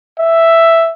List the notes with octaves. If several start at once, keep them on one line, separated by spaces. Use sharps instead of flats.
E5